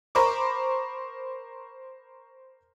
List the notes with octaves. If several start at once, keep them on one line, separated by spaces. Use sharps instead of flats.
A#4 C5 A#5 B5 C#6 D6